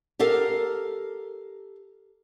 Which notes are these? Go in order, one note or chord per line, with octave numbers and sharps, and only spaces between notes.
G4 A4 A#4 F5